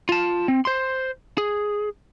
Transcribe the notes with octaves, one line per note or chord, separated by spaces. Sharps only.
F4 A5
C4
C5 C6
G#4